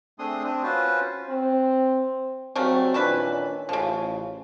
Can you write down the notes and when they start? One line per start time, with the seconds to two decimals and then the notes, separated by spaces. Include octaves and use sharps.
0.19 A3 C4 D4 G#4 C6 D#6
0.43 C4 D4
0.63 C#4 F4 F#4 B4 C5
1.29 C4
2.56 C#3 F#3 G3 A3 C4 A#4
2.94 A#2 D#3 E3 C#4 D4 B4
3.69 A1 C#3 F3